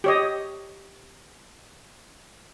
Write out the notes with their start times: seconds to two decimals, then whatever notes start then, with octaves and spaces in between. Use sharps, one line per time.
0.04 G4 C#5 D#5